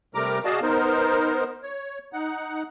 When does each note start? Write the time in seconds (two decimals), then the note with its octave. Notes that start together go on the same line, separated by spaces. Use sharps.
0.15 C3 G3 A3 A#4 A#5 D6
0.45 F#4 G#4 D5 D#5 F5 A5
0.62 B3 D#4 A#4 C5
1.63 C#5
2.13 D#4 F#5